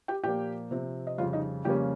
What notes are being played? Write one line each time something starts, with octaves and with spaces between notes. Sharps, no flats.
G4 G5
A#2 F3 A#3 G4 G5
C3 F3 C4
D#5
F2 C#3 G3 F4 F5
D#4 D#5
F2 C#3 G3 A#3 C#4 G4 G5